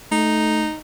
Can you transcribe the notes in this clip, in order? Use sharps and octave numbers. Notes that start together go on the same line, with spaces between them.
A3 D#4